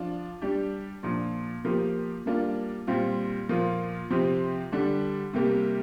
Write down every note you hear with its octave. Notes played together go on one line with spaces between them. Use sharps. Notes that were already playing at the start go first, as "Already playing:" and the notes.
Already playing: F3 D4 F4
G3 D4 G4
A#2 F3 D4
F3 A#3 G4
G3 A#3 D4 F4
A#2 G3 C4 F4
A#2 F3 A#3 F4
C3 F3 C4 G4
D3 G3 D4
C3 G3 A#3 G4